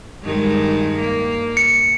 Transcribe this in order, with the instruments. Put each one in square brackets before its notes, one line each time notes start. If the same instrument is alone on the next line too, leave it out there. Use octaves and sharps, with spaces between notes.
[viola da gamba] G2 D#3 G#3
A#3
[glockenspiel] C#7